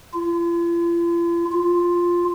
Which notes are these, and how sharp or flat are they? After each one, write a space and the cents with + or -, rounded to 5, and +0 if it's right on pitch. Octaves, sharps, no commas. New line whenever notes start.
F4 -45
F4 +0